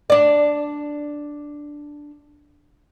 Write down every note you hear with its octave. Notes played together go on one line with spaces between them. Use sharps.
D4 D5